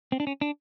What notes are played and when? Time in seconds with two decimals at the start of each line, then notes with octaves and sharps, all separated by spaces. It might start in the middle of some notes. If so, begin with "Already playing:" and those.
0.12 C4
0.20 D4
0.27 C#4
0.41 D4